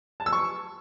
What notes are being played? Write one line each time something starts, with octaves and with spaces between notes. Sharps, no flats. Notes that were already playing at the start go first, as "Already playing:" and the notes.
A5
E6
C#6